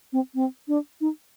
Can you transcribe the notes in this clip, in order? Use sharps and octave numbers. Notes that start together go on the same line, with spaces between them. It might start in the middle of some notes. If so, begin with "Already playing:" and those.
C4
C4
D4
D#4